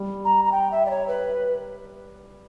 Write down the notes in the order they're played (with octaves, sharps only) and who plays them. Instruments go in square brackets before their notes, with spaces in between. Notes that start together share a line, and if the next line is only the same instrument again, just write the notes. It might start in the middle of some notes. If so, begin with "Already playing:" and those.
Already playing: [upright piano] G3
[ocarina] A#5
A#5
G5
E5
D5
C#5
B4